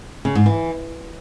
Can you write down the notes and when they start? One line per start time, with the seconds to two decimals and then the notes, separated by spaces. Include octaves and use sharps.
0.25 C#3
0.35 G#2
0.46 E3